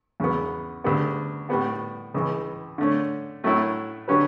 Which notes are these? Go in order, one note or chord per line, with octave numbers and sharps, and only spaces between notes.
E2 C#3 F#3 B3
D2 C#3 G3 B3
A2 G3 B3 F#4
C#2 C#3 E3
D3 A3 C#4
A2 F#3 A3 C#4 E4
D3 F#3 C#4 G4 B4